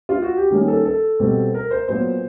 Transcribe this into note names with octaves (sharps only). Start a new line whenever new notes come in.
F4
F#4
G4
D#3 G3 A#3 C#4 G#4
A4
A4
B2 G3 C4
A#4
C5
A#2 F#3 B3 C5